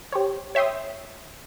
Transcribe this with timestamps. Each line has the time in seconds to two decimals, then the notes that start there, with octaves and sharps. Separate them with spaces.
0.12 G4 C5 C#5
0.55 C#5 E5 G5 C6 D#6